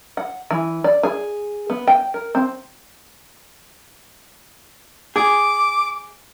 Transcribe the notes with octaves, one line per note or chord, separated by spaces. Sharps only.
F#5
E3
D5
G#4
B3
G5
A#4
C4
G#4 D6